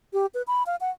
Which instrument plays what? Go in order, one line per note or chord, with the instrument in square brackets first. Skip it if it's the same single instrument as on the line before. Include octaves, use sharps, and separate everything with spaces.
[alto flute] G4
B4
B5
F5
F#5